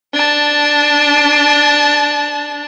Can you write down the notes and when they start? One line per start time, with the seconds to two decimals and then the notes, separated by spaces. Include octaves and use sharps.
0.13 D4 A5